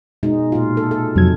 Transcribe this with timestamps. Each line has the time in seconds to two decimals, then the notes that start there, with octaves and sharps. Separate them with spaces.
0.23 B2 G#3 D#4
0.52 A#2 F4
0.77 A4
0.91 A4
1.16 F2 C3 F#3 G#6